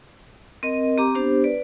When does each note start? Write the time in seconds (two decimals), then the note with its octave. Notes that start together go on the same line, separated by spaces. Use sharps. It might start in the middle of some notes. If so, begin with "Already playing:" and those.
0.63 C4 A#4 D#5
0.98 C4 G4 A#5 D6
1.15 B3 D4 G4 C5
1.44 B4 D5